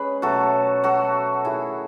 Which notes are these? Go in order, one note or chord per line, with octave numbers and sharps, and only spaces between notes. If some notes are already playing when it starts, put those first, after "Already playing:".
Already playing: G#3 C#4 G#4 B4
B2 F#3 A3 F#4 A4
F#4 A4
D#3 A3 E4 G#4